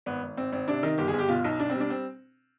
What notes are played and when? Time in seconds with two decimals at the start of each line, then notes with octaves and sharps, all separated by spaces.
0.06 G#1 B3
0.22 G#1
0.37 G#1 C4
0.53 G#1 C4
0.68 C3 D4
0.83 D#3 D#4
0.98 G1 G4
1.08 G#4
1.13 G1
1.19 G4
1.29 B2 F4
1.44 B1 D#4
1.59 B1 D4
1.70 C4
1.74 G3
1.80 D4
1.90 C4